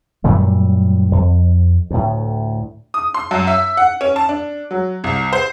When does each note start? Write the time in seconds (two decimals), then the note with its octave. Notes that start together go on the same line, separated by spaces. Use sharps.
0.24 F#2 A#2 G3 A3
1.12 F2
1.90 D2 A2
2.94 D#6
3.14 C6
3.31 F#2
3.47 E5
3.77 F#5
4.01 C#4
4.16 A5
4.29 D4
4.71 F#3
5.04 C2
5.33 C5